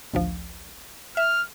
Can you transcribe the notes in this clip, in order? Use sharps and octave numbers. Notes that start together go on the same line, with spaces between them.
A1 D2 F3
E5 F6